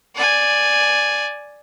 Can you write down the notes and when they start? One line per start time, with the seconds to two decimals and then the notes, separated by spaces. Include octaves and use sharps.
0.15 D5 G#5